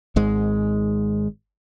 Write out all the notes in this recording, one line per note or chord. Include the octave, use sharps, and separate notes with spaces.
G#1 G#2 G#3